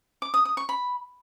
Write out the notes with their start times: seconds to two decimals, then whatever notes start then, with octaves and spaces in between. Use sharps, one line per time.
0.22 D6
0.34 D#6
0.45 D#6
0.57 C#6
0.69 B5